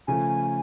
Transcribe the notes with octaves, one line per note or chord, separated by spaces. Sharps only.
C#3 F3 A3 G#5